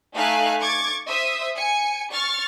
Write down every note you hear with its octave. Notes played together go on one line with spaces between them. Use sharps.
A3 D#4 F5 G#5 F#6
C#6 D6 G#6 A6
C5 E5 D#6
G#5 C#7
C#6 F6 A6